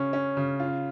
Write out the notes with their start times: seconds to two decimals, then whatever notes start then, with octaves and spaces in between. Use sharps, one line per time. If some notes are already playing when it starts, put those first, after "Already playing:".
Already playing: C#3 C#4
0.13 C#4
0.37 C#3
0.60 F4